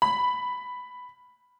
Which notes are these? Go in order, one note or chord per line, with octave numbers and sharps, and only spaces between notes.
B5